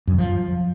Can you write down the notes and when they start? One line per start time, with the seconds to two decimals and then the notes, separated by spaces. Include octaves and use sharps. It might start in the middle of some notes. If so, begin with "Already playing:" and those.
0.07 F#2
0.13 D3
0.19 F3